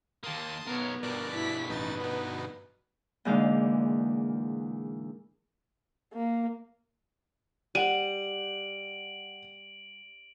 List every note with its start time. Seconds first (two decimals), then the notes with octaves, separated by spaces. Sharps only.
0.24 D#3 A#3 A5 C6 D#6
0.67 B1 B3 A#4 C#5
1.03 G2 B2 A#4 D5 F#6
1.33 E4 B6
1.69 A1 D#4 B4 A6
2.00 B3 D#4
3.25 E2 A#2 D3 G#3 D#4 F5
6.14 A#3
7.75 G3 F#5 D7 D#7 F#7